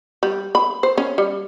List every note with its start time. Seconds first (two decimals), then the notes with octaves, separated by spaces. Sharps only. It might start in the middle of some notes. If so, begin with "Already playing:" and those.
0.23 G3
0.55 B5
0.83 C5
0.98 C#4
1.18 G3